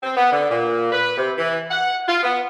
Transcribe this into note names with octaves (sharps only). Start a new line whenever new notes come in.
C4
B3
D3
A#2
B4
C3
E3
F#5
F4
B3